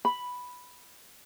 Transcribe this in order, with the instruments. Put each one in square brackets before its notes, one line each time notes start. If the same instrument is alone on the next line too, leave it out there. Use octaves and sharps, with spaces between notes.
[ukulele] B5